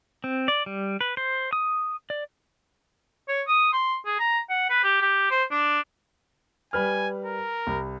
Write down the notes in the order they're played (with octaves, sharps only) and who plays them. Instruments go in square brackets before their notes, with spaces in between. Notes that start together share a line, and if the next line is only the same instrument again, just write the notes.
[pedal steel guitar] C4
D5
G3
B4
C5
D#6
D5
[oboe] C#5
D#6
C6
G#4
A#5
F#5
B4
G4
G4
C5
D4
[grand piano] G3 B4 F6 [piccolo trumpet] G#5
[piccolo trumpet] A#4
[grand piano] C2